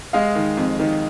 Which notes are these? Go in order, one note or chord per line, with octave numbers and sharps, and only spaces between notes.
G#3 D#5 F5
D#3
F2
D#3